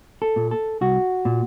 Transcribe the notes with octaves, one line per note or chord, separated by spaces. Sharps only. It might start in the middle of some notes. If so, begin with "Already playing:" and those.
A4
A#2
A4
C2 F#4
A#2